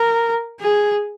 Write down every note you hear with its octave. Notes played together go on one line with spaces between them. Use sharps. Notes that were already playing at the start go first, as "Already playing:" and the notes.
Already playing: A#4
G#4